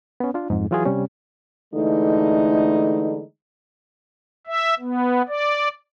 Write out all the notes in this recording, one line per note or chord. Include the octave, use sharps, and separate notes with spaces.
B3 C#4
D4 F4
F2 G#2
E3 F#3 F4 F#4 G#4
C3 G3 C#4
D3 E3 G#3 A3 D#4
E5
B3
D5